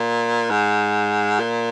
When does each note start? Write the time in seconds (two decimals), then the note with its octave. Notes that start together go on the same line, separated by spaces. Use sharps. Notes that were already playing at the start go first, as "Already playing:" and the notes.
Already playing: A#2
0.50 G#2
1.39 A#2